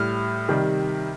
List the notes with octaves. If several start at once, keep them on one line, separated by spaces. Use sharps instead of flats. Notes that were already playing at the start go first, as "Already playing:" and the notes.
Already playing: A2 G3 F6
C3 D#3 G3